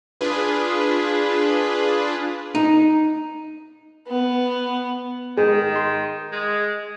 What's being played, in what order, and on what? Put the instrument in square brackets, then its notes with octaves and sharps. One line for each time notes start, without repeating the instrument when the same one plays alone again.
[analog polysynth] D4 F4 G#4 B4
[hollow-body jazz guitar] D#4
[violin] B3
[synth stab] G#2 G#3 [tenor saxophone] D#3
[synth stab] C6
[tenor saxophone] G#3